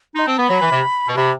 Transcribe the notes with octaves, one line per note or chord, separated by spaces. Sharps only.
D#4 C6
C4 A5
B3 B5
F#3
E3
C3
B2
C3 B5